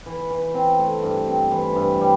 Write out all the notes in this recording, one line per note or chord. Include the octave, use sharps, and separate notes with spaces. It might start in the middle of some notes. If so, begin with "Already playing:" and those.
E3
E3
C4
A3
G2
C4
E3
G2
G3